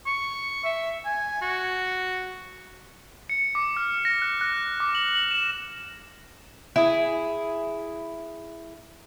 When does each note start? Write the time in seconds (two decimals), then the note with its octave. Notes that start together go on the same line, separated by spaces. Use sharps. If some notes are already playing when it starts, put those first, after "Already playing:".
0.07 C#6
0.64 E5
1.05 G#5
1.42 F#4
3.30 C#7
3.55 D6
3.77 F6
4.05 A#6
4.22 F#6
4.41 F#6
4.80 D6
4.95 F#7
5.16 F#7
5.31 E7
6.76 E4 G#4